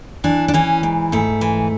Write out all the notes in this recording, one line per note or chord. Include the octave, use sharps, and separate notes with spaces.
E3 D4
D4
E3 C#4
G#2
G#2 A3
E3